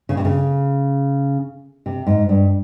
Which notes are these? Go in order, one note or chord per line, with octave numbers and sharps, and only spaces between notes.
C#3
C3
C#3
C3
G#2
G2